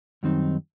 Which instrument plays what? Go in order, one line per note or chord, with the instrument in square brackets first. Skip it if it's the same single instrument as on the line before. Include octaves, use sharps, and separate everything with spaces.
[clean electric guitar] F#2 D#3 G3 C4 D#4